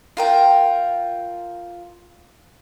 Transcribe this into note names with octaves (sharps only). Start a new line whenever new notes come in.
F4 A#4 G5